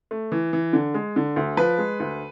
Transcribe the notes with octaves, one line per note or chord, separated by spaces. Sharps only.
A3
E3
E3
D3
G#3
D3
D2
F3 B4
G#3
D2